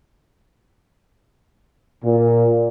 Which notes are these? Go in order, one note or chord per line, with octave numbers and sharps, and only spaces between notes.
A#2